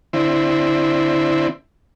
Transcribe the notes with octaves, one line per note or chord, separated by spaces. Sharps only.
D3 C4 E4